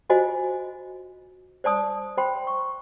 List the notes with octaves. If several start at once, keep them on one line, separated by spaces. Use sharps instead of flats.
F4 F#4 C5 D#5 G#5
C5 D5 A5 D#6
C5 G5 B5 C6
C#6